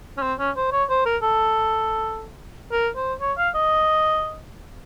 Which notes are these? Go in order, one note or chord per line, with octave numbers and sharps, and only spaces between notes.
C#4
C4
C#4
C5
C#5
C5
A#4
A4
A#4
C5
C#5
F5
D#5